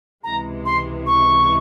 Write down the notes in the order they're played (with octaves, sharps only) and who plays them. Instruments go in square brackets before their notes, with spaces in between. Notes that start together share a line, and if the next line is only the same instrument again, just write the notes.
[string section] C#2 C3 E3 G#3 [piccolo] A#5
[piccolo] C6
C#6